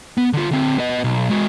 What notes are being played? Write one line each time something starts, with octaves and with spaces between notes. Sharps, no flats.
B3
D3 F4
D3 C4
B3 D#5
B1
G#3 F#4